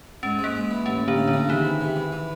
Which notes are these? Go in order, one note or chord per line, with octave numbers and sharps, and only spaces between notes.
G#2 C#4
G#3
A#3
G#3
E3
A1 C#4
A1
D3 D4
A2
D3 D4
F3
C3 D#3 D#4
E3
C3
E3
E3